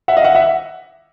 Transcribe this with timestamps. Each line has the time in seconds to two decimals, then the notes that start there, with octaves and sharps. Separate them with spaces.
0.08 E5 F#5
0.17 D#5 F5
0.24 E5 F#5
0.35 E5 F#5